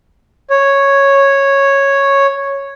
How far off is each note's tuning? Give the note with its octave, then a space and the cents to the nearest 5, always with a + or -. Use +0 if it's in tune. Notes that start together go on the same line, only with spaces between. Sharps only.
C#5 -5